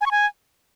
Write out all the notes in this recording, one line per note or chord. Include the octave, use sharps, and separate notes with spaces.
G#5
C#6
G#5